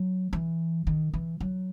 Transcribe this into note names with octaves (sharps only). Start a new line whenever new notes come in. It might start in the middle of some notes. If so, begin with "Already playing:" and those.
Already playing: F#3
E3
D#3
E3
F#3